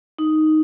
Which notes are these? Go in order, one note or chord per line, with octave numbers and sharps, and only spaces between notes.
D#4